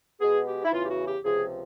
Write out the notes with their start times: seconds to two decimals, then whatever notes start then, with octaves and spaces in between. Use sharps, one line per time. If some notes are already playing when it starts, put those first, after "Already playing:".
0.21 B2 G#3 B3 G#4
0.47 G4
0.64 E4
0.72 E2 C#3 E3 F4
0.84 G4
0.90 F#4
1.06 G4
1.24 C#2 C3 F3 G#4